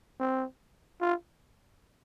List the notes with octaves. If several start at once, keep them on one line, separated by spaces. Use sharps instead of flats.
C4
F4